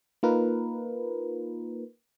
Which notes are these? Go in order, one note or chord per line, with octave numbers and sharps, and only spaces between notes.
A#3 D#4 F4 A#4 B4